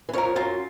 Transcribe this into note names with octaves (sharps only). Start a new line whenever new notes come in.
E3
F2 F3 A#4 C#5
F#2 F#3 F4